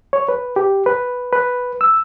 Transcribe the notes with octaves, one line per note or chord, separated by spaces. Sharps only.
C#5
B4
G4
B4
B4
E6